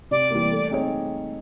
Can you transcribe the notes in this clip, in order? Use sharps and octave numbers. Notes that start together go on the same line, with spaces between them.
C3 D5
E3 G3 A#3
A3
C4 D#4 G#4 C#5